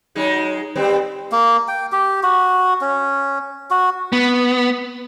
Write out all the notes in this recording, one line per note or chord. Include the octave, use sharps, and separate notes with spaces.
F#3 G#3 D#4
G3 B3 C4
A#3
G5
G4
F#4
C#4
F#4
B3